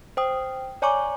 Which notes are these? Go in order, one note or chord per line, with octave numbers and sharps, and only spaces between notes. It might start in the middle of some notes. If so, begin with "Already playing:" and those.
C5 G5 D#6
C#5 D5 G#5 A#5 C#6 D6